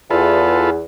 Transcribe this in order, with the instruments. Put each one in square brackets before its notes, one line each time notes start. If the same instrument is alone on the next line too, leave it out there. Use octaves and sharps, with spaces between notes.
[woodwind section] E2 [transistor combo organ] F4 A4 B4